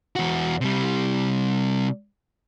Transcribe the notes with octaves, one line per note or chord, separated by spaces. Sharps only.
E2 F#4
C3 G3